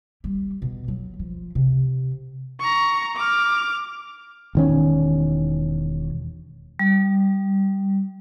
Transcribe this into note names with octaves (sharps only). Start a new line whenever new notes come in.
G3
B2
F#3
F3
C3
A#5 C#6
D6 F6
E1 D#3 C#4
G3